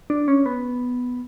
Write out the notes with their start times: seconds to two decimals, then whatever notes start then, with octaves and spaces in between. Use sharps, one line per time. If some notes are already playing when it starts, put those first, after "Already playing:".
0.10 D4
0.28 C#4
0.46 B3